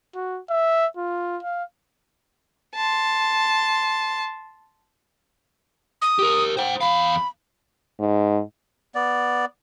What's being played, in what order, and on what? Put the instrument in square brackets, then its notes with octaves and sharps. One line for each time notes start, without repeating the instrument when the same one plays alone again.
[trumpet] F#4
E5
F4
F5
[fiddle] A5 C6
[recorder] D#6
[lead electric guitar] G4 A#4
[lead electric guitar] C5 F#5 [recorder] G5
[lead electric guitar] E2 F5 [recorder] B5
[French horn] G#2
[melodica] B3 D5